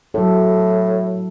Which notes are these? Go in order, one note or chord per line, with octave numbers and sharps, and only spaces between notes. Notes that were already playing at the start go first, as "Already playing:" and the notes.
A2 F#3 E4 A4